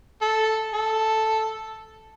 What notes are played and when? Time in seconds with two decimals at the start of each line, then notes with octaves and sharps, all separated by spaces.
0.21 A4
0.73 A4